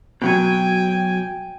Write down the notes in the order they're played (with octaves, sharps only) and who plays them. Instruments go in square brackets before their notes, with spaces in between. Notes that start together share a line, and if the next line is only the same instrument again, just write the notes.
[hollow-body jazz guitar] B2 F#3 [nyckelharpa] G5 G#5